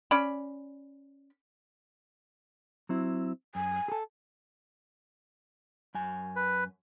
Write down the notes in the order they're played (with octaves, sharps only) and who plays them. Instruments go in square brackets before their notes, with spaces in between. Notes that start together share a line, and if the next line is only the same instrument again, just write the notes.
[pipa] C#4 D5 B5
[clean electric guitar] F#3 C4 E4
[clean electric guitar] F#2 [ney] G#5
[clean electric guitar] G#4 A4
[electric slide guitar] F#2 G#5
[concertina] B4